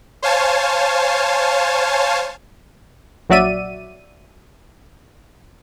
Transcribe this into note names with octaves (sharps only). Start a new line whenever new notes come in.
C5 C#5 F5 G#5 A5
A#1 F#3 F#4 D5 E5 D#7